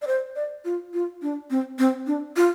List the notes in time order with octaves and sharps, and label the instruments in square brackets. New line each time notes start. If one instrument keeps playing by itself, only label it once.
[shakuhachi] D5
C5
D5
F4
F4
D4
C4
C4
D4
F4